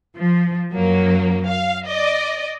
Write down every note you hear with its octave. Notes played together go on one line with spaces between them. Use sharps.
F3
F#2 F#3 A#3
F5
D5 D#5